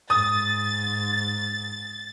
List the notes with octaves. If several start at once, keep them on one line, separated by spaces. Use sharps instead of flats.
G#2 D#6 A6